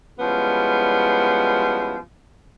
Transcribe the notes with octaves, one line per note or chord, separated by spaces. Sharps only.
F3 G3 G#3 B3 C#4 E4